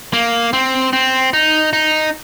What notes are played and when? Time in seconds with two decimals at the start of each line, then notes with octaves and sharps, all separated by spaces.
0.13 A#3
0.53 C4
0.93 C4
1.33 D#4
1.73 D#4